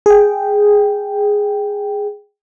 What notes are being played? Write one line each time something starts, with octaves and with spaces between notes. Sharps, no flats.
G#4 G5